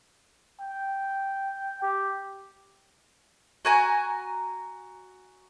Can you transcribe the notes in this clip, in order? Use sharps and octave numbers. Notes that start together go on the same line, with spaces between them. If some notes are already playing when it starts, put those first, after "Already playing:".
G5
G4
F#4 G#5 A#5